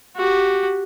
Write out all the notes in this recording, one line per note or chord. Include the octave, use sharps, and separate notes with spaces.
F#4 G4